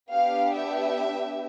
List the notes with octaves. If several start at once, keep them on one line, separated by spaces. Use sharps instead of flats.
B3 D4 G4 F5
E5